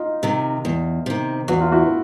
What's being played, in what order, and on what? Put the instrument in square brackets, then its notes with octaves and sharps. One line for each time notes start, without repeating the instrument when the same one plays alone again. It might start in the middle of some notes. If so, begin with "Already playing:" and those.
Already playing: [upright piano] D#4 F4
[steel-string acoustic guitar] C3 D#3
E2
C3 D#3
[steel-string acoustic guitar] E2 [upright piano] F#4
[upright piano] F4
E4 F#4